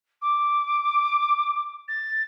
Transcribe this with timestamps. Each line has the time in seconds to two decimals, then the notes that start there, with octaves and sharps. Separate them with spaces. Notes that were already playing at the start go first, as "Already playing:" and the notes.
0.22 D6
1.88 A6